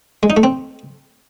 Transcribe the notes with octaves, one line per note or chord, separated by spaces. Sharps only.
G#3
D#4
A3
C4